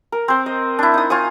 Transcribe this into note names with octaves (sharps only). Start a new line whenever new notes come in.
A#4
C4 C5
D#5
D4 E4
D#4 D#6
F4 G#5 C#6 D#6